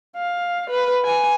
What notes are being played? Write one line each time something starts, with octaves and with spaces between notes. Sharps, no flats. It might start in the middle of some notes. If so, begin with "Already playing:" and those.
F5
B4
G#5